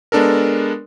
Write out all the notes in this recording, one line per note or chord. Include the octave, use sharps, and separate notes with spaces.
G#3 B3 D4 A4 A#4